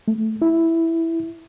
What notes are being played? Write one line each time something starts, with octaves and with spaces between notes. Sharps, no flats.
A3
E4